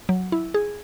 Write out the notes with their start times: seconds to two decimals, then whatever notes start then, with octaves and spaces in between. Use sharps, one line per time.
0.09 F#3
0.32 E4
0.54 G#4